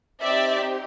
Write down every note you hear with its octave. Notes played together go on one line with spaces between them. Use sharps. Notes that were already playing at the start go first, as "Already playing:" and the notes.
C4 D#4 G4 D5 E5